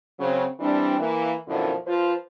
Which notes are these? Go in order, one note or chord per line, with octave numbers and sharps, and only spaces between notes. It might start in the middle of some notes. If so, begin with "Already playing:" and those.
C#3 F#3 C4
E3 G3 C4 D4
E3 A#3
F#2 B2 D3 D#3 F3 E4
F3 F4 B4 C5